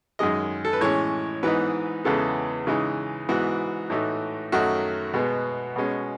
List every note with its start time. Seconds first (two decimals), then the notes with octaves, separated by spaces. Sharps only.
0.19 F#2 D#3 G#3 D#5
0.65 A4
0.73 B4
0.81 A2 E3 G#3 C#4 C#5
1.43 G#2 E3 B3 D#4 B4
2.04 E2 C#3 G#3 B3 A4
2.67 C#3 E3 G#3 D#4
3.29 G#2 E3 B3 F#4
3.90 A2 E3 A3 D#4
4.52 F#2 D#3 F#3 A3 D#4 F#4
5.14 B2 G#3 B3
5.76 B2 G#3 C#4